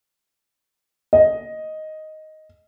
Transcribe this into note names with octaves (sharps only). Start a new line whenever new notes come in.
D#5